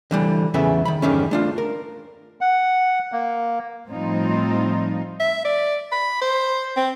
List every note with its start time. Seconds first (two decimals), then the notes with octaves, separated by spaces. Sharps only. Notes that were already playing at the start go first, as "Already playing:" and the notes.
0.11 D3 E3 G3
0.54 E2 C#3 E3 B3 A4 E5
0.85 D#3 B5
1.02 E2 G2 D3 D#3 G3 C#4
1.31 A3 D4 F4
1.58 A#4
2.41 F#5
3.12 A#3
3.89 A2 F3 G3 C4 D#4 F4
5.20 E5
5.45 D5
5.92 B5
6.21 C5
6.77 C4